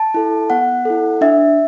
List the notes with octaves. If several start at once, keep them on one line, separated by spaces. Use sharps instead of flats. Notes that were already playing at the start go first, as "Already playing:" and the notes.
Already playing: A5
E4 A4
B3 F#5
E4 A4
D4 E5